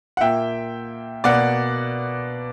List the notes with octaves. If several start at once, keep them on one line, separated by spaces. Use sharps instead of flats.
F#5
A#2 A#3 E5 G5
B2 A#3 D5 F#5